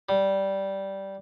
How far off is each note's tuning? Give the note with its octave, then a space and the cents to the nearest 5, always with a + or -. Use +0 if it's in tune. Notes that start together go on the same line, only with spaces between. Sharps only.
G3 -10